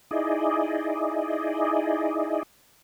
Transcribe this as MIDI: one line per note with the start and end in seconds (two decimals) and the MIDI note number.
0.11 2.43 63
0.11 2.43 64
0.11 2.43 68
0.11 2.43 74
0.11 2.43 75